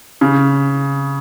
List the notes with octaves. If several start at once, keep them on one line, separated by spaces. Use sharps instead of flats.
C#3